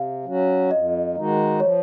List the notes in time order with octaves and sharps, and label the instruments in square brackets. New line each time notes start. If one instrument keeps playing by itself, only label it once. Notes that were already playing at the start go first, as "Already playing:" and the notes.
Already playing: [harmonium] C3 [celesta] F5
[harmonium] F#3 C#4 F#4
[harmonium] F2 [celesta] D#5
[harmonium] D#3 G#3 D#4 F#4
[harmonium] F3 [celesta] C#5